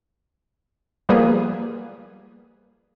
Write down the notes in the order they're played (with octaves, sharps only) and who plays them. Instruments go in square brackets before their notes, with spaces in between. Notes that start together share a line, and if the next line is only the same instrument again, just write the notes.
[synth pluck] F3 G3 A#3 B3 G#4